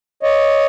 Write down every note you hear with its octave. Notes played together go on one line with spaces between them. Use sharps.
C#5 D#5